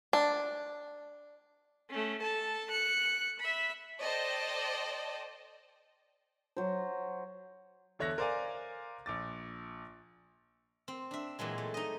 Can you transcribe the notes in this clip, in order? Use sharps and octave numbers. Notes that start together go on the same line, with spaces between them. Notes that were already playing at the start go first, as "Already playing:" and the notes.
D4
A3 C#4
A4 A5
F#6 C#7
E5 B5
A4 C5 D5 D#5 G5 A5
F#3 C5
E2 D3 C#5 E5 F#6 A#6
A#4 C5 D5 F5 G#5
A#1 D6 A6
C4
D4 E5
A#2 E3 F#3 G#3
A3
D#4 D#5